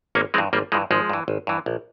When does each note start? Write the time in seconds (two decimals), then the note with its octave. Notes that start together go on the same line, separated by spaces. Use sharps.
0.15 G#1 A#3 C#4
0.34 E3 G#3 C4
0.38 G2
0.53 G#1 G3 A#3
0.72 G2 E3 F3 G#3
0.91 G#1 F3 G#3
1.10 G2 E3
1.28 G#1
1.47 G2 E3
1.66 A#1